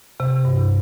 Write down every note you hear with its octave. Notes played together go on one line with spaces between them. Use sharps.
C3
G2